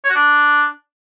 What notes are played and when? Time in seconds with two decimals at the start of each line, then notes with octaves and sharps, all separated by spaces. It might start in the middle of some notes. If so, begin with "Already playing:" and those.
0.04 C#5
0.10 F#4
0.15 D4